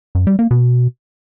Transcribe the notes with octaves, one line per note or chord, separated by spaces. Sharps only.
F#2
G3
A#3
B2